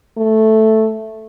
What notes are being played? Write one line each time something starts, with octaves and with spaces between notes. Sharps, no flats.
A3